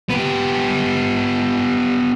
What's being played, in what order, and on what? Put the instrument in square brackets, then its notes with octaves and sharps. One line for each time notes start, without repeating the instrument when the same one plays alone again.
[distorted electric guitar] B3 G4